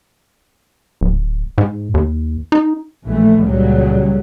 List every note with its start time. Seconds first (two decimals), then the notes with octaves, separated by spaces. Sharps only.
1.01 D1
1.58 G#2
1.94 D#2
2.52 D#4
3.06 A#1 E3 A3
3.42 C#2 A#2 C#3 F#3 G3